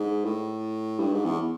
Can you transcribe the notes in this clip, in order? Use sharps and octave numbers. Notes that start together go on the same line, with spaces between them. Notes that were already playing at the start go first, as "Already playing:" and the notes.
Already playing: G#2
A2
G2
G#2
E2